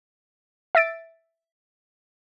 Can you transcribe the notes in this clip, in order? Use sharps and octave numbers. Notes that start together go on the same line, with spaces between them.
E5 E6 A6 D7